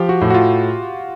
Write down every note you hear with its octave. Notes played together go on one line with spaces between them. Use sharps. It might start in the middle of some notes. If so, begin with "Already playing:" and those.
Already playing: F3 G4
F#4
A2
F#4
F4